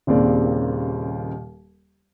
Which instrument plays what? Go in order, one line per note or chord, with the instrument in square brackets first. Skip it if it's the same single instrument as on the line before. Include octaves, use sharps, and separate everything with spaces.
[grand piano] D#1 D#2 C#3 A#3 C4 D5